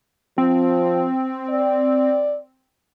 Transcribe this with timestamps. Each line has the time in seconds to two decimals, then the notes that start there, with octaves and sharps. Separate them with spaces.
0.38 F3 C4
1.50 D5